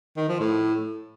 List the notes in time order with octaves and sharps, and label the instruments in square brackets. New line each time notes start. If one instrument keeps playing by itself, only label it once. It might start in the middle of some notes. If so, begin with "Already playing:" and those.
[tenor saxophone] D#3
F3
A2